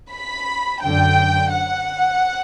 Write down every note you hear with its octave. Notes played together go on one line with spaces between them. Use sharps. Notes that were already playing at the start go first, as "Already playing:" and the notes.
B5
F#2 D3 G5
F#5